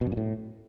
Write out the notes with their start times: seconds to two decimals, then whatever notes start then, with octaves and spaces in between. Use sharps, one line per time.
0.01 B2
0.07 F#2
0.12 A#2
0.17 A2